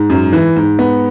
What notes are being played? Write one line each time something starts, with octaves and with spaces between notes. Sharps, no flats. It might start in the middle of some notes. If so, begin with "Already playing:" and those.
Already playing: G#2
F#2
E3
G#2
B3